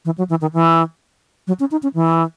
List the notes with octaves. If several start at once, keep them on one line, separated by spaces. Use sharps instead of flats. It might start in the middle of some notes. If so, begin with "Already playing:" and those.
E3
F#3
E3
D#3
E3
F#3
C#4
D#4
C#4
E3